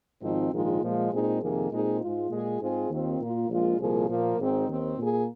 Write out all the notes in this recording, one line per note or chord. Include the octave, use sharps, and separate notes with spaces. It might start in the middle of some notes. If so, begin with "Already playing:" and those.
G#1 G#2 F3 C4 D#4
A#1 G#2 D#3 G#3 F4
A#2 F3 G#3 F4
A#2 G#3 C4 D#4 G#4
F2 C3 D#3 A#3 G#4
A#2 G#3 C4 D#4 G#4
G#2 G#3 F4
A#2 G#3 F4 G#4
G#2 G#3 C4 F4 G#4
D#2 D#3 C4 F4
A#2 A#3 F4
A#1 A#2 G#3 F4
C2 A#2 F3 A#3 G#4
A#2 F3 A#3
G#1 G#2 D#3 C4 D#4
D#2 D#3 C4
A#2 A#3 G#4